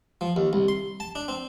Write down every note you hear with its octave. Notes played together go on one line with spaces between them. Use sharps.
F3
D#2
C2
C6
A5
D4
C4